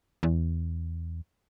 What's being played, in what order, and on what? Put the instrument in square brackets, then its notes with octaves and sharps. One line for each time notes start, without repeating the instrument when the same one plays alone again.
[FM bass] E2